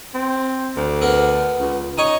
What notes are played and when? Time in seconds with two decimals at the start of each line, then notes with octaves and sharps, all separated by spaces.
0.15 C4
0.77 D2
1.01 B3 A#4
1.60 C#2
1.98 D#4 C#5 D#5 G#5